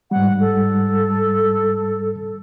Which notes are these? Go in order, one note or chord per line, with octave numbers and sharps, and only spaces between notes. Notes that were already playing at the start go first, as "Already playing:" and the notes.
G#2 G3 F#5
A4